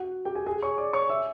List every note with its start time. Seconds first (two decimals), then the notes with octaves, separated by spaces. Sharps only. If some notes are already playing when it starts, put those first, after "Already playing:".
Already playing: F#4 F#5
0.25 G4 G5
0.35 G#4 G#5
0.46 G#4 G#5
0.62 C#5 C#6
0.78 D5 D6
0.93 C#5 C#6
1.09 E5 E6